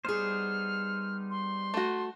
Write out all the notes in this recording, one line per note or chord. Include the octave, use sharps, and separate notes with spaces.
G3 B3 D#4 G#4 C5 F6
C6
A3 F#4